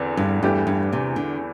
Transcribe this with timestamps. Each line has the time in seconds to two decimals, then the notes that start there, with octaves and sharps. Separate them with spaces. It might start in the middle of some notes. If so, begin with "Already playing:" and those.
Already playing: E2 D3 C4
0.17 G2
0.43 E2 G2 E3 A3 E4 G4
0.67 G2
0.92 C3
1.16 D3